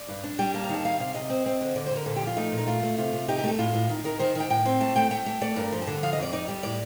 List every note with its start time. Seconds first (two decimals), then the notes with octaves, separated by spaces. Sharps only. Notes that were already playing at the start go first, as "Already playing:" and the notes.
Already playing: D5
0.08 G2
0.24 D4
0.39 G3 G5
0.54 A#3 A5
0.64 A#5
0.69 D#3 A5
0.85 G3 F5
1.00 C3 F5
1.14 C3 D#5
1.30 C4
1.46 C4
1.61 D3
1.76 D3 D5
1.86 C5
1.91 D3 A#4
2.06 A#2 A4
2.16 G4
2.21 F3
2.27 F4
2.37 A3 D#4
2.52 A#2
2.58 D#4
2.67 A3 F4
2.83 A3
2.98 C3 F4
3.13 C3
3.28 D#4 G4
3.38 G4
3.44 A3 A4
3.58 A2 F4
3.74 A2
3.89 D#3
4.04 D#3 A#4
4.19 D#3 C5
4.35 D#3 G5
4.50 A2 G5
4.66 C4
4.81 A3 A5
4.96 A3 G5
5.11 A3 G5
5.26 A3
5.41 A3 D5
5.56 G2 A#4
5.72 F3
5.82 A5
5.87 D3
6.03 F3 F5
6.13 D#5
6.18 F2 D5
6.33 D#4 D5
6.48 G3
6.63 A2 D5